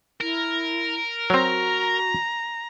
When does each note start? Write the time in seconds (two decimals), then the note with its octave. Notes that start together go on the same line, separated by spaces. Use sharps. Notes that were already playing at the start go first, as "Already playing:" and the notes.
0.21 E4 A#4
1.30 F#3 C4 F#4 A#5